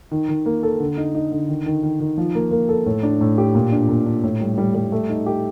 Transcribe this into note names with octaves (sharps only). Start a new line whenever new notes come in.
D#3
D#3
A#3
A4
D3
D#4
D#4
D3
D#3
D#3
D#3
D#3
F3
A#3
A#3
A4
A2
D4
A2
G4
A#2
D4
A#2
D4
A2
G3
G3
G3
A3
D#4
G4